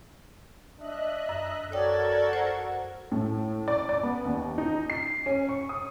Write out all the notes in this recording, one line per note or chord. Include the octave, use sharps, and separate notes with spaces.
D4 D#5 E5 F#6
F#2
F#4 A4 A#4 C#5 D5 G5 G#6
C5 F#5
A2
D5
D5
B3
D#2
D#4
C7
C#4
C#6
D#6